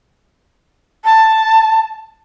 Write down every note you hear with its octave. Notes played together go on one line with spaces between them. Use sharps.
A5